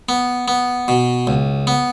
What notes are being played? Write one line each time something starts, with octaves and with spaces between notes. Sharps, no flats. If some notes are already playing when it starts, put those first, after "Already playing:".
B3
B3
B2
C#2
B3